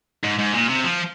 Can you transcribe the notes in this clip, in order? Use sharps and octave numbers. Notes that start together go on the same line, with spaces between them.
G#2
G#2
A#2
C3
F3